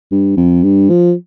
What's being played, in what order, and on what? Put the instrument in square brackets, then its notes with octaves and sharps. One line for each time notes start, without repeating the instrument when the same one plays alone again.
[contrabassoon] G2
F2
G2
F3